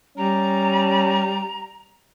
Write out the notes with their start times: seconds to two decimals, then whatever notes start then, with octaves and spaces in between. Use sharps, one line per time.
0.18 G3 C#4 A#5